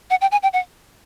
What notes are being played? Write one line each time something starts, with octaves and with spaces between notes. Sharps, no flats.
F#5
G5
G#5
G5
F#5